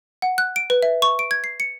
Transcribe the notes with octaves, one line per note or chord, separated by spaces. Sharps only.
F#5
F#6
D7
B4
E5
C#6
D7
G#6
C7
C#7